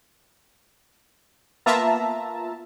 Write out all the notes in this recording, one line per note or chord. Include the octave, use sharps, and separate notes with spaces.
A#3 B3 F4 E5 A5 A#5